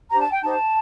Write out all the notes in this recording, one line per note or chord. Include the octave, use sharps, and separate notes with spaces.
D4 G4 C5 A#5
A5
G5
D#4 G4 C5 A5